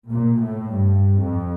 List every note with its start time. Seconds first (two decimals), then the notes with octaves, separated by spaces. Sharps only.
0.09 A#2
0.41 A2
0.72 G2
1.20 F2